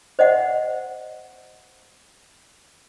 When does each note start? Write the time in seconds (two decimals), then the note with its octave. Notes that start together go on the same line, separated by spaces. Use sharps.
0.19 C5 D#5 E5 F#5